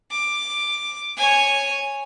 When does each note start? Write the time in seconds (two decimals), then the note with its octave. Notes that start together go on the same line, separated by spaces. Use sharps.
0.11 D6
1.17 C#5 G#5